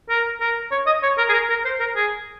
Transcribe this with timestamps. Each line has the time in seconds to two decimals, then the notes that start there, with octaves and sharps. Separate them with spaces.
0.09 A#4
0.40 A#4
0.71 C#5
0.87 D#5
1.03 C#5
1.18 A#4
1.29 G#4
1.33 A#4
1.49 A#4
1.65 C5
1.80 A#4
1.96 G#4